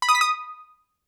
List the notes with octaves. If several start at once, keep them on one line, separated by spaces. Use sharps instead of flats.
B5
D#6
B6
D#6